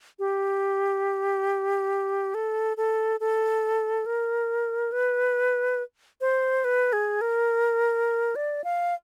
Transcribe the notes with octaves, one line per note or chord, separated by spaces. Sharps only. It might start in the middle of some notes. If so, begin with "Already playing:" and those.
G4
A4
A4
A4
A#4
B4
C5
B4
G#4
A#4
D5
F5